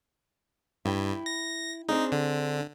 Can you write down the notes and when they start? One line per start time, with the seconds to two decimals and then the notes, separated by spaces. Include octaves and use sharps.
0.85 G2 E4 G5
1.26 A#6
1.89 C4 D4 D#4 G#4
2.12 D3